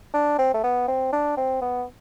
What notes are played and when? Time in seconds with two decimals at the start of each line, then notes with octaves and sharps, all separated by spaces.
0.14 D4
0.39 C4
0.54 A3
0.64 B3
0.88 C4
1.13 D4
1.37 C4
1.62 B3